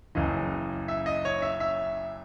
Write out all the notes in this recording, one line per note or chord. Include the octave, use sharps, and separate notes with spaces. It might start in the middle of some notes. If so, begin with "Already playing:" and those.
F#1 F#2 C#3 E3 D#5
E5
D#5
C#5
E5
E5